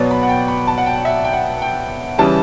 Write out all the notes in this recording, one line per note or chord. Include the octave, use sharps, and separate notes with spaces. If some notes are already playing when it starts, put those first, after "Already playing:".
Already playing: B2 F#3 B3 D5
B5
F#5
G5
B5
A5
F#5
G5
E5
G5
F#5
G5
C#3 E3 G3 A5